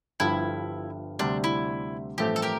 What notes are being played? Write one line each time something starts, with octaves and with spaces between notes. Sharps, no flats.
G1 G2 F3 E4
D2 C3 G3 D4
E4
A1 G2 F3 A3 C4 G4
A4
G4 A#4